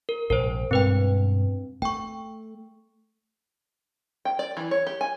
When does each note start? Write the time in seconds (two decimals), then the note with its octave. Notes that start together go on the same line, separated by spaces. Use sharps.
0.09 A#4
0.30 A#1 G#2 C3 A#4 C5
0.71 G2 B2 G#3 C4 B4 G5
1.82 A3 G5 C#6
4.25 G5
4.39 D5
4.57 E3
4.71 C#5
4.87 G4
5.01 G#5